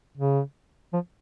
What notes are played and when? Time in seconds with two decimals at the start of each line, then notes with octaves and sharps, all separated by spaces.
0.17 C#3
0.93 F3